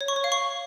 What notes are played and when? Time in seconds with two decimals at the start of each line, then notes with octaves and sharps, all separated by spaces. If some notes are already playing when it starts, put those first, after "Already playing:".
0.01 C#5
0.08 C#6
0.16 C#5
0.24 F5
0.32 C#6